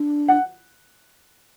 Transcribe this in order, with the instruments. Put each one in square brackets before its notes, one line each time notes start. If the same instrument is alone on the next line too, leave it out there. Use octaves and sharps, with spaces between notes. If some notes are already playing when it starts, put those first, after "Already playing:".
Already playing: [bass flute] D4
[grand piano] F#5